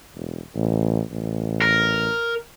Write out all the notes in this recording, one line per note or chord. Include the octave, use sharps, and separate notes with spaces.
E1
A1
A1
A#4